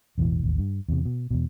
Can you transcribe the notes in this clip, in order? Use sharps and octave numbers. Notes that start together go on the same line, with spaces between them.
A1 E2 B2 E3
A1 D#2
G2
E2 C3
B2
E2 B2